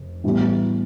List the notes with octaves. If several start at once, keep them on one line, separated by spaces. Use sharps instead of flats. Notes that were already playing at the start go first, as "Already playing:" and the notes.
Already playing: F1
A2 E3 G3 B3